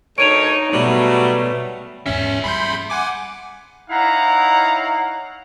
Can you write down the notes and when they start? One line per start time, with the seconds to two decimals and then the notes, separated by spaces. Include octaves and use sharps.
0.18 D2 D#4 A#4 C#5 D7 D#7 F7
0.72 B2 F#3 G3 A3
2.06 E2 G#2 C#4 G#4 E5
2.44 G3 B5 C6 G6
2.90 F#5 G#5 D6
3.90 D#4 E4 C#5 F5 F#5 A#5